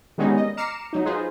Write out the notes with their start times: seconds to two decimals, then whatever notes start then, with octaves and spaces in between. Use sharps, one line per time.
0.18 D#3 G3 G#3 B3 C#4 D#4
0.37 D#5
0.57 A#5 D6 F6 C7 C#7 E7
0.93 F#3 D#4
1.05 D#4 F4 G#4 B4 C5